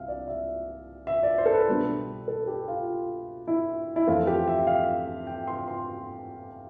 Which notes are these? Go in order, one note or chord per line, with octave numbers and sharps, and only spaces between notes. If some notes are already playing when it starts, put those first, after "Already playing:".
Already playing: C2 E5 F5
D5
E5
E5
D5
C5
A4
B4
B2 G3 D4
A4
G4
F4
E4
E4
F2 E3 A3 C4 F4
G4
E5
F5
G5
C6
C6